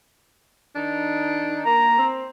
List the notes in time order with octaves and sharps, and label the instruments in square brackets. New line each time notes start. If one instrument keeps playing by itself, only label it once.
[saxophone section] D#3 D4 D#4
[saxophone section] A#3 [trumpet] A#5
[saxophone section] C4